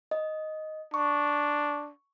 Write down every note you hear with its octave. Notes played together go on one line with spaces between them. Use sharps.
D#5
D4 C#6